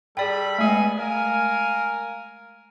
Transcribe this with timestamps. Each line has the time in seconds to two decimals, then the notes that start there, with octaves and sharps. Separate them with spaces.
0.17 G3 G#4 A4 D5 G5 B5
0.58 G#3 A3 B3 D#5 G#5
0.98 A#4 F5 G#5